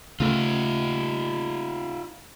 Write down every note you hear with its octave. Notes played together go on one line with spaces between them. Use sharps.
C#3 A3 D#4 F4